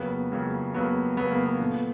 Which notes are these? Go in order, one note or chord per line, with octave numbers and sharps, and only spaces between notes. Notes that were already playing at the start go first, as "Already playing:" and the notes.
Already playing: F2 C#3 F#3 A#3 B3
F2 C#3 F#3 A#3
F2 C#3 F#3 A#3 B3
F2 C#3 F#3 A#3 B3
A#3
B3
A#2 F3 A3